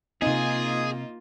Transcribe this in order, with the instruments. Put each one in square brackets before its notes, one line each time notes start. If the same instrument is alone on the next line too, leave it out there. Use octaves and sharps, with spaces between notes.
[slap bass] C3 C4 [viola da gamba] A#3 F4 [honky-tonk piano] D#4 [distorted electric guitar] G#4